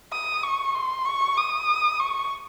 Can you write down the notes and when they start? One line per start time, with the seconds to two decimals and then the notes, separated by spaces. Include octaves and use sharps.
0.12 D#6
0.43 C#6
0.75 C6
1.06 C#6
1.37 D#6
2.00 C#6